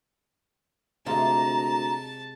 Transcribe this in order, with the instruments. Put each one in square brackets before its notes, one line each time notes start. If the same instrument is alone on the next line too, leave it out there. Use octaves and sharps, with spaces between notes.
[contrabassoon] D2 [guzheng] C3 G#3 F4 [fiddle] A5 [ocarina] A#5